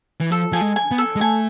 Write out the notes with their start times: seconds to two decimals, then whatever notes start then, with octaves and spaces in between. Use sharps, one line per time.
0.20 E3
0.32 F3 A4
0.52 F3 G#5
0.61 G#3
0.76 G#5
0.91 B3
0.98 A4
1.16 G#3
1.21 A3 G#5